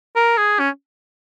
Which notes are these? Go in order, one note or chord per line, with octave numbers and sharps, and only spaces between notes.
A#4
G#4
C#4